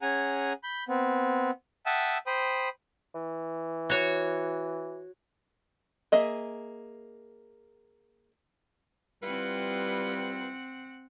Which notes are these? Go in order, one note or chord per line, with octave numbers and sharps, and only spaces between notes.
C#4 G#4 F#5 G#5 A#5
B5 G6
B3 C4
E5 F#5 G5 A5 D#6 E6
C5 G5 B5 D#6
E3
F#4 C#5
A#3 G#4 D#5 E5
G3 C4 E4 F4 B4 F#5